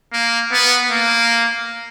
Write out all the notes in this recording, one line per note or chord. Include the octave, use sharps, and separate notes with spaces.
A#3
B3
A#3